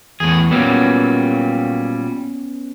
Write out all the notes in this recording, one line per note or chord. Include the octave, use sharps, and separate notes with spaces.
E2 A2 G#4
A#2 F#3 G3 B3 C#4